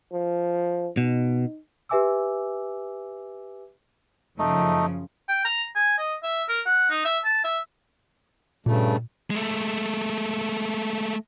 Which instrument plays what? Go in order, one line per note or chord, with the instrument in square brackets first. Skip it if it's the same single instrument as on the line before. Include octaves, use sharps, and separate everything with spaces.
[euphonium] F3
[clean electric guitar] B2 [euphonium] D#4
[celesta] G4 B4 E5 G#5 D6 E6
[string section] F#2 C#3 F3 [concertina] A3 D#4
[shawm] G5
A#5
G#5
D#5
E5
A#4
F#5
D#4
E5
A5
E5
[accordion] G2 C#3 A3 [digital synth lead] A#2
[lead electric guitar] G#3 A3